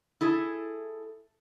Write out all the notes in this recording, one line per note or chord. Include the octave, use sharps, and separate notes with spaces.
E4 G#4 A4